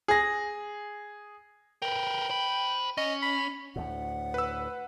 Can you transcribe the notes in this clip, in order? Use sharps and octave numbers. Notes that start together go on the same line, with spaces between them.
G#4 A#6
A#4 B4 G5
C5 B5
C#4 D#5
B5
D2 A2 F#5
B4 E6